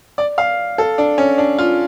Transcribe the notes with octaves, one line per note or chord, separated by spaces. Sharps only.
D5
F5
A4
D4
C#4
D4
F4